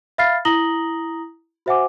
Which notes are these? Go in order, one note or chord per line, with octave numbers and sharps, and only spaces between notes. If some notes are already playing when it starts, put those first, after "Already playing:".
E5 F5 B5 F6 A6 C7
E4 A#5 D#6 A#6 F#7 G7
F#4 C5 E5 F#5 G#5 D6